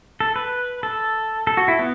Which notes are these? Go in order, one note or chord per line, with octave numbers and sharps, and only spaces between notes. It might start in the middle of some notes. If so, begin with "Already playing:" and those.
A4
B4
A4
A4
F#4
E4
B3